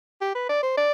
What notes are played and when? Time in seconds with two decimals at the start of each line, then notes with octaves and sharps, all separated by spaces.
0.21 G4
0.35 B4
0.49 D5
0.63 C5
0.77 D5